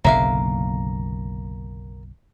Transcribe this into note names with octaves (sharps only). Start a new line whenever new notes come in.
F#1 B1 D3 A#3 E5 F5